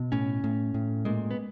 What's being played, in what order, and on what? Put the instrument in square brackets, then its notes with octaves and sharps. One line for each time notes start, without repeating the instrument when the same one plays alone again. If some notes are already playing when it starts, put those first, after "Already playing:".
Already playing: [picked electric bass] B2
A2 C#4
A2
A2
A#2 G#3
B3